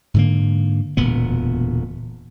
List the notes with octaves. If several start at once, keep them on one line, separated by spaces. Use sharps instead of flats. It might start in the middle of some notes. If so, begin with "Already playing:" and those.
G#2 D3 A#3
E1 D2 A#2 B3